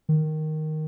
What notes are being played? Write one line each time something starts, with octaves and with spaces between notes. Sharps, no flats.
D#3